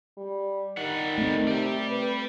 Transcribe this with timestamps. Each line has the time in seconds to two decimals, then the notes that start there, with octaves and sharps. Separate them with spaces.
0.17 G3
0.77 D#3 G3 F#5
1.18 A3 C4
1.48 C3 D5 G5
1.90 B4